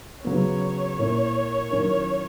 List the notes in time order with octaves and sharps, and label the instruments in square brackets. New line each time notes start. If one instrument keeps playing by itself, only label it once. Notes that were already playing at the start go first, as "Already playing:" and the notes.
[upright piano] C#3 F#3 B3 [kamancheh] C#5
[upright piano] A#2 A#3 E4 A#4
D#3 F#3 C#4 E4 A#4